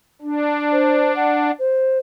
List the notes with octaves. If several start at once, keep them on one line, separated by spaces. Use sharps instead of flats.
D4
C5
F#5
C5